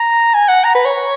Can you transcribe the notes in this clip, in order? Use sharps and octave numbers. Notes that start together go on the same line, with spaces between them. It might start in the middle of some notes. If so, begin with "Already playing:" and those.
Already playing: A#5
G#5
F#5
A#5
B4
C#5